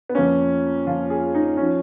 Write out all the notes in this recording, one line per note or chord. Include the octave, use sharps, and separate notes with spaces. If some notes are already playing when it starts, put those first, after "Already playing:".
B3
F2 F3 A#3 C#4
F2 F3 A#3 F4
G#4
D#4
F3 C#4